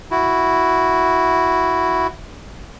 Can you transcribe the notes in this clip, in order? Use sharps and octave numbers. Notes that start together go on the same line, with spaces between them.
E4 F#4